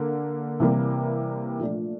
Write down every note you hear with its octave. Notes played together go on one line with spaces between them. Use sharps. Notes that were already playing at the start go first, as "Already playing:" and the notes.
Already playing: D3 A#3
C3 E3 G3 A#3
A#2 F3 A3 D4